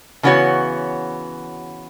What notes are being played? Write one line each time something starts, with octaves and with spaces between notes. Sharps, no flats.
C#3 E3 B3 F#4 C#5